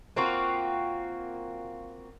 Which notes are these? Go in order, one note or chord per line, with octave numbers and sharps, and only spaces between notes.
A#3 C4 F4 F#4